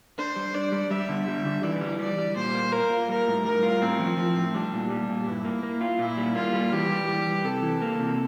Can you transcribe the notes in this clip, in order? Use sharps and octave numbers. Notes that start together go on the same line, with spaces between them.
D4 C5
G3
D4 D5
G3
G3 E5
D3
G3
D3
E3 D5
G3
G3 D5
G3
A#2 C5
A#3
A#3 A#4
F4
G3 A#4
A2
G3 A#4
F4
A2 C4
F3
F3
A2
G3 D4
A#2
G3
A#2
G2 E4
A#3
A#3
F4
A#2 E4
G3
A#3 F4
G3
E3 G4
G3
G3
E3
C3 A4
E3
A#3
C3